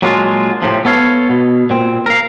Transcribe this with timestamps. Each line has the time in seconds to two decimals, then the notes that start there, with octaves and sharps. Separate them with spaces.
0.02 A#2 F#3 G#3 D4 F4
0.62 A2 C3 F3
0.85 B3 A4 C#5 F5
1.30 B2
1.70 A#2 C4
2.06 A#4 F5